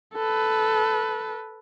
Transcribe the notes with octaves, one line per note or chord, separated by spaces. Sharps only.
A4 B4